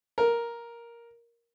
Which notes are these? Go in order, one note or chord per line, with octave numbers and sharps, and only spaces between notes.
A#4